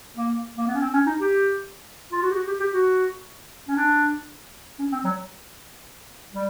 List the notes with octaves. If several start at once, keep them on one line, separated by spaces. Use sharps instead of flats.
A#3
A#3
B3
C#4
C4
C#4
D#4
G4
F4
F#4
G4
F#4
G4
G4
F#4
C#4
D4
C#4
C4
F#3
G3